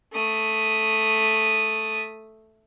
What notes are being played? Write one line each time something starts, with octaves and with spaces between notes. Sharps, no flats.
A3 D#6